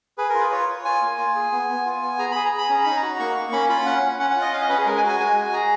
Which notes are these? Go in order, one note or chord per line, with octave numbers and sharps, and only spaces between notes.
G#4 B4
A#4
F4
B4
F4 C#5
F4
F4 G#5
A#3
F4
G#4
B3
B3
F4
B3
G#4 A#5
G#4 B5
A#5
G#4
B5
C#4 A#5
D#4 B5
A#5
F#4
A#3 C#6
A#3
C#4 B5
F4 B5
C#4 F#5
C#4
C#4 F#5
F#5
F4
D#5
C#4 F5
D#5
C#4 B4
G#4
G#3 A#4
G#5
F#4
G#5
G#3 G#5
F#4
G#4 A#5